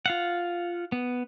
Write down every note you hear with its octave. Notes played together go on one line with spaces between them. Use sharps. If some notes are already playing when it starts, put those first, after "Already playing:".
F4 F5 F#5
B3